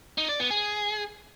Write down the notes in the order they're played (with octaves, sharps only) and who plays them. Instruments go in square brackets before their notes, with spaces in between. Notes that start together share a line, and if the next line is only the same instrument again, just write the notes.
[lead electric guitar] D#4
D5
B3
G#4